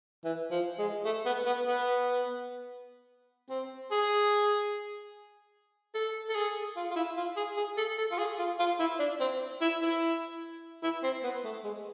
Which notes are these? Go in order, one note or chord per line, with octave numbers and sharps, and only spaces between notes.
E3
F3
G#3
A3
B3
B3
B3
C4
G#4
A4
A4
G#4
F4
F4
E4
F4
G#4
G#4
A4
A4
F4
G#4
F4
F4
E4
D4
C4
E4
E4
E4
C4
B3
A3
G#3